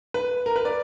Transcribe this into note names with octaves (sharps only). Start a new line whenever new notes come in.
B4
A#4
B4
D5